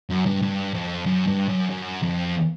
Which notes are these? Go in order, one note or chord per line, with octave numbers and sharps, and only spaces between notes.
F#2
G2
G2
F2
F#2
G2
F#2
F#2
F2